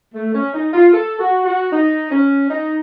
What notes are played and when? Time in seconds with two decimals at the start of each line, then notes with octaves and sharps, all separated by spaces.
0.14 A3
0.34 C#4
0.53 D#4
0.73 F4
0.92 A4
1.19 F#4
1.45 F#4
1.72 D#4
2.10 C#4
2.50 D#4